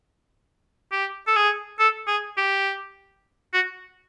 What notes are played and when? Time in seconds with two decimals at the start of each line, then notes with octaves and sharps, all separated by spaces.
0.92 G4
1.27 A4
1.36 G#4
1.79 A4
2.08 G#4
2.38 G4
3.54 F#4